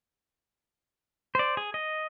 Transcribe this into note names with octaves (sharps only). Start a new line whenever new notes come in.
C5 D5
G#4
D#5